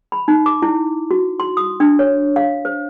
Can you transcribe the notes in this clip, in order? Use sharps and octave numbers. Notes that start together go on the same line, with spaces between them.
B5
D#4
D6
E4
F#4
C6
D#6
D4
C#5
F5
C5